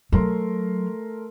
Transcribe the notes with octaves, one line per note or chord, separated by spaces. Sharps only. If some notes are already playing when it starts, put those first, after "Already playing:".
F#3 A3 A#4 C6